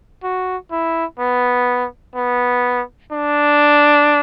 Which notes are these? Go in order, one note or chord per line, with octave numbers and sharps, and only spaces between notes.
F#4
E4
B3
B3
D4